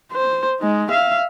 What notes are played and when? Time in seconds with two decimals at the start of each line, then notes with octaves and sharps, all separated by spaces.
0.13 C5
0.60 G#3 D#4
0.91 E5 F5